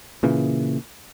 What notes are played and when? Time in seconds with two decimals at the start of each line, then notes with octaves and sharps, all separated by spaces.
0.23 A#2 C#3 E3